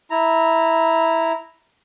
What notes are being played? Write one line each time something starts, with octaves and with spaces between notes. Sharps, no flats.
E4 A#5